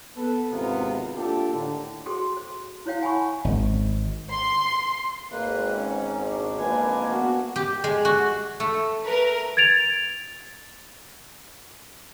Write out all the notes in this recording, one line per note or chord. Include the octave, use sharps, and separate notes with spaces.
B3 A4 B4
G#1 C#2 C3 B3 F4 A#4
A#3 D4 F4 G4 A4
A2 D3 D#3
F#4 G#4 A4 C5 G5 C6
C5
E4 C5 C#5 F5 G5
F#5 G#5 A5 B5 C#6
G#1
C6
G#1 G#2 A#3 B4
C#4
D4 C#5
G#1 F2 A#3 B4 G#5
B3 F#4
G4
G#3
F#4
A3
A#4 B4
G#6 A6 D7 F7